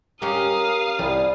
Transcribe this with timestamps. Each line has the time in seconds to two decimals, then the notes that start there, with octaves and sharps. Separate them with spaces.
0.22 C#4 G4 A#4 F5 D#6
0.99 C2 G3